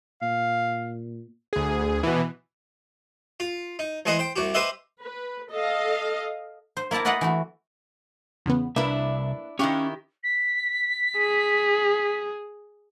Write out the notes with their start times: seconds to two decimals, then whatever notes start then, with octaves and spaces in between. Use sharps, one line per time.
0.22 A#2 F5
1.53 D2 G#4
2.03 B2 E3
3.40 F4
3.79 D#4
4.06 E2 G#3 G#4 C5 D#5 F#5
4.19 C5 G5
4.36 C2 F#4 G4
4.54 G4 B4 C5 D#5 E5 F#5
5.01 B4
5.51 A4 D#5 F5
6.77 C5
6.91 A#3 E4 D5 A5 A#5
7.05 F#4 B4 D5 D#5 F5 F#5
7.21 E3 A3 F#4
8.46 E2 C#3 B3
8.76 C2 A#3 D4 E4 B4 E5
9.59 D#3 C#4 E4 G4 F5 C#6 F#6
10.23 B6
11.17 G#4